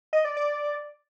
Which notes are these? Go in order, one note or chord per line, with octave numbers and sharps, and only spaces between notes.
D#5
D5
D5